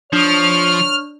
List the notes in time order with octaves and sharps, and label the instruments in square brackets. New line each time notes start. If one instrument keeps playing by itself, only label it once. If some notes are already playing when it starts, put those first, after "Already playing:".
[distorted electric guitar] F3 [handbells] D4 [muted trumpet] C#5 [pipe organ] F6